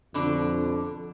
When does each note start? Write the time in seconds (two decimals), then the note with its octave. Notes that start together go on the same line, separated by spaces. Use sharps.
0.14 F2 B2 D3 D4